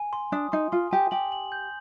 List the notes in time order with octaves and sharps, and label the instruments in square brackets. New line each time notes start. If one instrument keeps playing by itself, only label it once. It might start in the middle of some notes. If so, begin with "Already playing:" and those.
Already playing: [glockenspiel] G#5
C6
[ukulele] D4 [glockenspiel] D#6
[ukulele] D#4 [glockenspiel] C6
[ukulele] F4 [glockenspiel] C6
[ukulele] G4 [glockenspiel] G#5
[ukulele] G4 [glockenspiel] F#7
[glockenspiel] F#7
G6